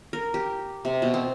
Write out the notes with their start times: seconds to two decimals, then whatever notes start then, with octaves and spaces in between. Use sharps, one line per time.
0.13 A#4
0.34 G4
0.85 C3
1.02 B2
1.14 C4